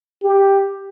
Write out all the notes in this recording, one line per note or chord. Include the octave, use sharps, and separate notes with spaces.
G4